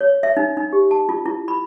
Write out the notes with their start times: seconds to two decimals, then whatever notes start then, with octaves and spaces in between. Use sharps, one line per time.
0.01 C#5
0.23 E5
0.37 D#4
0.57 D#4
0.73 G4
0.91 A5
1.09 F4
1.26 E4
1.48 B5